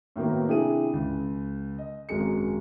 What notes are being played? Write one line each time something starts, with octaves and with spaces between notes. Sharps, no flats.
A2 D#3 F#3 A#3 B3
C3 D4 E4 G#4 D#7
C#2
D#5
G#1 F#2 F#3 G#3 C#7